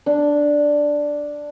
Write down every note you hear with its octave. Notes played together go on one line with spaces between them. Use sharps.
D4